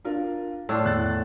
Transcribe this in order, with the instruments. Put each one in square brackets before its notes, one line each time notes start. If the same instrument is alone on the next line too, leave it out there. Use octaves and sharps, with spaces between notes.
[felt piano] D4 F4 A#4
[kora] A2 D4 F4 [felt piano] E6
[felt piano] E2 F#6 A6